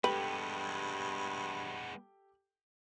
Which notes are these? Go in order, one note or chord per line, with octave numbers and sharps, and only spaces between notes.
G2 G#3 B3 G4 A4 B4 G5